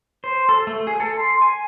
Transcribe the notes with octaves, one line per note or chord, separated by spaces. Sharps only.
C5
A4
A3
G#4
A4
C6
G#5